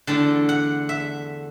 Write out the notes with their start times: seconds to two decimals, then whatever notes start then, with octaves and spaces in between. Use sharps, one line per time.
0.07 E2 D3 A3 D4 A5
0.49 F#5
0.89 E5